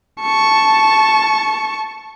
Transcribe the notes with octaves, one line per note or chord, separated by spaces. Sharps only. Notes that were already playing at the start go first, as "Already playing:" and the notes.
A5 C#6